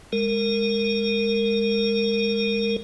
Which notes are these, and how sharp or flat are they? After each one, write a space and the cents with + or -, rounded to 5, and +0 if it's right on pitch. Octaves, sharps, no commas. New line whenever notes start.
G#3 -15 A#4 -20